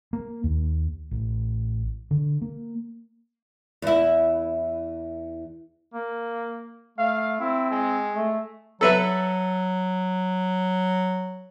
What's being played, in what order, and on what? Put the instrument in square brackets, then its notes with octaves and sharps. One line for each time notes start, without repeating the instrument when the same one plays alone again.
[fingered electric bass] A#3
D#2
A1
D3
A#3
[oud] E2 E4
[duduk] A#3
[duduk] A3 [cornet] F5
[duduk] C4 [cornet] E4
[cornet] G#3
[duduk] A3
[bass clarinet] F#3 [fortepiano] A4 B4 E5